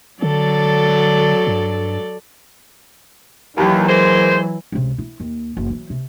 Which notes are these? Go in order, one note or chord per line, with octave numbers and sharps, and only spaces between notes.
D3 F#3 A4 D5
G2
D#2 E3 F#3
G#3 A#3 C5
C#2 C3
E4
D#2
F#1
E3 F#3
C3